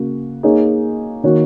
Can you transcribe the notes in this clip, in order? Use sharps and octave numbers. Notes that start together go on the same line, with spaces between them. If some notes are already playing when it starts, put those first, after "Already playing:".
Already playing: C#3 A#3 F#4
A#3 D#4 G#4 C#5
D#3 A#3 F#4 C#5